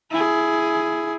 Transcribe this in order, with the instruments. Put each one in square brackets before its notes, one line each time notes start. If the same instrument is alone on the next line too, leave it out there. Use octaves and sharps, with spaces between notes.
[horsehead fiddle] E4 G#4